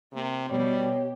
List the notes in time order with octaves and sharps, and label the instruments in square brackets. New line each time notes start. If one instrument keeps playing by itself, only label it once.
[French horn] C3 [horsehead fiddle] A#3
[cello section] B2 [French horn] G3 [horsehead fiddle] G4 [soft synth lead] C#5